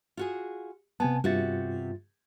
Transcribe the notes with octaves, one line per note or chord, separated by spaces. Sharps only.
F4 F#4 G#4
C3 B3 G#5 A5
G2 C3 F4 F#4 A6